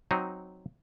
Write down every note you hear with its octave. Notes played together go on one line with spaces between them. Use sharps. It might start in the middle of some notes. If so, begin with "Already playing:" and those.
F#3 C4 D#4